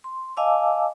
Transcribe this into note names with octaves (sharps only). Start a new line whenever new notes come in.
C6
D#5 F5 G#5 A5 D6 E6